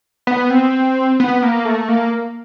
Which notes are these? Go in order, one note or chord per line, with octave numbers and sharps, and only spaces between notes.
B3
C4
B3
A#3
A3
A#3